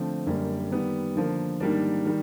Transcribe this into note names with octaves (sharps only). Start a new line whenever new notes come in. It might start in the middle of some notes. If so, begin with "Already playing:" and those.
Already playing: D3 F3 A3 C4
F#2 D3 G3 A#3
D#3 G3 B3
D3 F3 A#3
G#2 D#3 G3 A#3 D4
D#3 G3